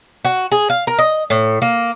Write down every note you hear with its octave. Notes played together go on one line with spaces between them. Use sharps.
F#4
G#4
F5
A#4
D#5
A2
A#3